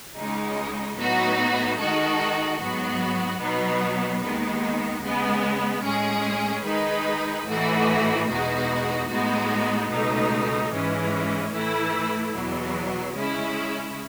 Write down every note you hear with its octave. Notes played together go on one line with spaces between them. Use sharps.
C#2 C#3 G#3 D#4
A2 F#3 B3 D#4 F#4
D#3 G#3 D#4 F#4 A4
G#2 F#3 B3 F#4
B2 F#3 B3 D#4
D#2 D#3 G#3 B3 D#4
C#3 G#3 B3
A2 G#3 C#4 G#4
D#3 G#3 D#4 G#4 B4
A2 E3 A3 D#4 F#4
E2 B2 G#3 D#4 F#4
A2 G#3 B3 D#4 F#4
C#2 B2 A3 D#4
G#2 E3 G#3 C#4
A2 E3 A3 E4
E2 B2 F#3
C#3 G#3 C#4 E4